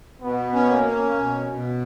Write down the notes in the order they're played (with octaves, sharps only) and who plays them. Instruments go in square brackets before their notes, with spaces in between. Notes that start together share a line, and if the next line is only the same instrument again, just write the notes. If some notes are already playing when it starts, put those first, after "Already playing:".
[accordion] B2 [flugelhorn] B3
[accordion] C#4
[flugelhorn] A#3
[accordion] C#4
B2
B2